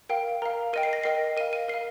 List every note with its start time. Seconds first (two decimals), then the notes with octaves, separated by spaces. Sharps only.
0.09 A#4 F5 G5
0.42 A#4 F5 A#5
0.73 A#4 D#5 G5 D#7
0.83 C7
0.93 A#6
1.03 A#4 D#5 G5 C7
1.37 A#4 D#7
1.40 F5
1.53 D#7
1.68 A#4 C7
1.74 F5